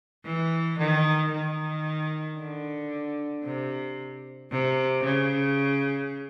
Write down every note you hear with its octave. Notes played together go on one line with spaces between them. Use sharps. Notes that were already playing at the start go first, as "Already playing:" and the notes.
E3
D#3
D#3
D3
C3
C3
C#3